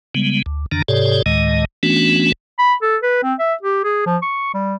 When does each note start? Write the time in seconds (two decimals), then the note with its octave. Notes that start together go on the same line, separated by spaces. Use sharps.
0.15 C#3 G3 G#3 B3
0.46 D2
0.72 F2 D3 D#3 D4 A#5
0.88 G#2 C3 G4 A4 C#5 D5
1.26 D2 A2 D#3 G#3 D#5
1.83 E3 A3 B3 C#4 D4 F#4
2.59 B5
2.82 A4
3.03 B4
3.23 C4
3.39 E5
3.63 G4
3.84 G#4
4.06 F3
4.22 C#6
4.54 G3